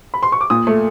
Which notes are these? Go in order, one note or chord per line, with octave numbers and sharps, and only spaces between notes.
B5
C6
C#6
D6
A#2 D#6
A3